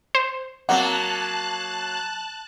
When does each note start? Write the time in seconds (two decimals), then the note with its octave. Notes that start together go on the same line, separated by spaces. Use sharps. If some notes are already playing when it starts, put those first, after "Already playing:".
0.15 C5
0.69 F#3 A#3 C4 F#5 A5 F#6